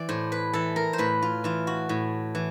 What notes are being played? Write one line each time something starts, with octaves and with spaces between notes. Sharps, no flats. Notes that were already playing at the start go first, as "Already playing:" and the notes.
Already playing: E3 D5
A2 C5
B4
E3 A4
A#4
C5
A2 B4
F4
E3 F4
F#4
A2
E3